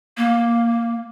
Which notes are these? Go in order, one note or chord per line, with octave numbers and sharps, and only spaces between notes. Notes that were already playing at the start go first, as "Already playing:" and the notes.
A#3